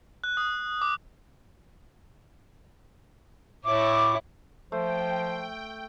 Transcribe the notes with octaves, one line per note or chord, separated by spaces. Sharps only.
F#6
D#6
D6
A2 E4 C#5 D6
F3 A3 C5 G5